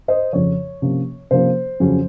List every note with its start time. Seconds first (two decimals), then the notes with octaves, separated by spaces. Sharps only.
0.08 C5 D#5
0.33 F2 C#3 F3 C#5
0.82 C3 F3 A#3 C#4
1.31 C3 F3 A#3 C#4 C5
1.80 F2 C#3 F#3 C#4